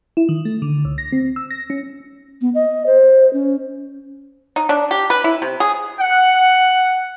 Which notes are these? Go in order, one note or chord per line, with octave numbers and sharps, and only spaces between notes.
E4
D#3
A3
D3
C#2
A#6
C4
E6
A#6
C#4
B3
D#5
C5
C#4
D#4
D4
G4
B4
E4
C3
G#4
F#5